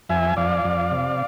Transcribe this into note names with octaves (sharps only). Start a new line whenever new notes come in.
F2 E5 G#5
F2 D5 F5
F2
C3